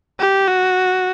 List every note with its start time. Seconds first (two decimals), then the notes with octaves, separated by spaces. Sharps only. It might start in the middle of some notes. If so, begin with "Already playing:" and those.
0.19 G4
0.48 F#4